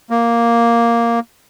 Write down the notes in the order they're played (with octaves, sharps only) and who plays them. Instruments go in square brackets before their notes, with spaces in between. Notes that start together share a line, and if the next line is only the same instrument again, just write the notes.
[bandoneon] A#3